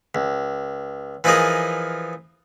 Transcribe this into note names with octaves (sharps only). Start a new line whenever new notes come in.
C#2
E3 F3 D#4 F4 G#4 A#4